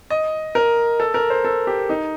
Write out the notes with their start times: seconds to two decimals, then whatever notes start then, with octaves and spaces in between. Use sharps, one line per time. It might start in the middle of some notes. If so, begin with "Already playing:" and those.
0.10 D#5
0.55 A#4
1.00 A4
1.14 A#4
1.30 C5
1.45 A4
1.67 G4
1.89 D#4